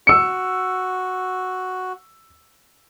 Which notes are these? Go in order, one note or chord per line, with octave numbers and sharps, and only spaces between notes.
F#4 E6 C#7